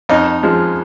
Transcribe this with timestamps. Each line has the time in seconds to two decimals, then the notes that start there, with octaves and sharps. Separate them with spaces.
0.09 F2 D#4
0.43 F3 G#3